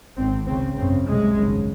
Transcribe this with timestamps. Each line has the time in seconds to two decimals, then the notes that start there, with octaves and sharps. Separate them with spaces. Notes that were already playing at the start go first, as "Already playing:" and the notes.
0.17 G#1 G#2 C4
0.47 C#2 C#3 C4
0.77 G#1 F#2 C#3 C4
1.06 C2 C3 G#3
1.36 G#1 F#2 C#3